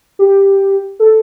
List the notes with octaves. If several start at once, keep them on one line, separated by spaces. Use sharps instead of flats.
G4
A4